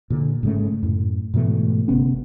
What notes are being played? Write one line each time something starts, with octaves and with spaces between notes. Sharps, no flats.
A#2 D3
G#2 C#3 A3
F#2 A2
G#2 B2 E3 A3
G1 C3 B3 C#4